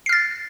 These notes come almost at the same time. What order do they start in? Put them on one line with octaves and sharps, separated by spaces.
C7 F6 A6